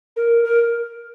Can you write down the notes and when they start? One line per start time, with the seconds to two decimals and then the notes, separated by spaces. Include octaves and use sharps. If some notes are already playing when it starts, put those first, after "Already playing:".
0.16 A#4
0.45 A#4